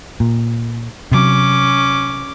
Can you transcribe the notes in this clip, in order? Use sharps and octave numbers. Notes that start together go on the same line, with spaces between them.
A#2
C3 F#3 C#4 D6